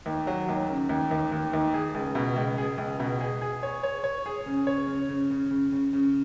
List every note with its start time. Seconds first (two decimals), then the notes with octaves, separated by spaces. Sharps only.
0.06 D#2
0.27 F#3
0.49 D#2
0.69 C#3
0.89 D#2
1.11 D#2
1.32 D#2
1.53 D#2
1.74 G#4
1.95 C#2
2.15 B2
2.37 C#2
2.58 G#4
2.78 C#2
3.00 B2
3.21 G#4
3.41 G#4
3.63 C#5
3.83 C#5
4.04 C#5
4.26 G#4
4.46 C#3
4.67 C#5
4.87 C#3
5.09 C#3
5.30 C#3
5.51 C#3
5.72 C#3
5.93 C#3